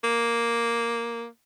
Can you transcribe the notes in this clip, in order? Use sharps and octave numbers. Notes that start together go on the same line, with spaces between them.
A#3